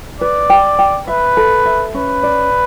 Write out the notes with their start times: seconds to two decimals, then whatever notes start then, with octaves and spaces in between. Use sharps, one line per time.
0.20 B4 D5
0.50 G5
0.79 G5
1.07 B4 E5
1.37 A4
1.65 E5
1.94 C#4 B4
2.23 D5